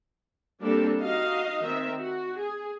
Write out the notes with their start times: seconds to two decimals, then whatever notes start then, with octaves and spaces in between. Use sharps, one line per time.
0.60 G3 A#3 C4 D4 G4 A4
0.99 D#4 F#4 D#5 F5
1.61 D#3 C4 E5
1.98 F#4
2.38 G#4